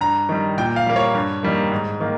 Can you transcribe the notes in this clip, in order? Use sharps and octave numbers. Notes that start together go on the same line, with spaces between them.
G2 A#5
D#3 G3
A#2 G5
F5
G3 A#3
C#5
G2
D#3 G3 A#3
G#2
D#3 A#3